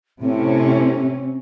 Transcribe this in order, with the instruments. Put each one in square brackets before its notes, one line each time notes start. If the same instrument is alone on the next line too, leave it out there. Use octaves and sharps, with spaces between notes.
[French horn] A2 [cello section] C3 C#4 [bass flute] C4